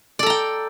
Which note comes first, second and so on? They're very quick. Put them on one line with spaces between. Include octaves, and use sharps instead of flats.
D5 A4 A#5 G5